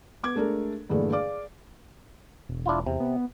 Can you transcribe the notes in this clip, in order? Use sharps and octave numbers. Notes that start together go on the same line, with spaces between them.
B3 D6 G#6
G#3 A3 D4 A4 A#4
G2 A#2 D3 E3 G#3 A3
G#4 D5 F5 D6
E1
D4 E4 F4
E2 C3
B3